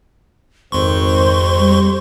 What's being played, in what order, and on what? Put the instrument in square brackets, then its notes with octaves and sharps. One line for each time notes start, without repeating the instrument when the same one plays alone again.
[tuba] G#1 [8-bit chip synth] F2 C6 C#6 [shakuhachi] C5
[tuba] G3